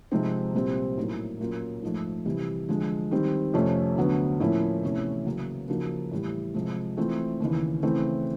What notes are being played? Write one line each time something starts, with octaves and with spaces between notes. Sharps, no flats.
C3 F3 G#3 C4 D#4
C2 A#2 G3 C4
A2 F#3 A#3 D#4
A#2 F#3 A#3 C#4 F4
G#2 F3 A3
C3 E3 G3
D3 F3 G#3
D#3 G3 C4
F2 C3 F3 A3 C#4
D2 D3 F#3 B3
A2 F3 A#3 C#4 E4
E2 C3 E3 A3 C#4
C#3 F#3 A#3
C#3 F3 A#3 D#4 F#4
A2 E3 G3
C3 F3 G#3
E3 A3 C4 F4
D#2 C#3 E3
C#3 E3 A3 C4